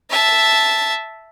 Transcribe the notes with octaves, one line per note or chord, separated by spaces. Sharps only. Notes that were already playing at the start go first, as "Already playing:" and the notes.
E5 A5